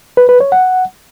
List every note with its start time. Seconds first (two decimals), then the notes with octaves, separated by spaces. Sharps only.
0.17 B4
0.29 B4
0.40 C#5
0.52 F#5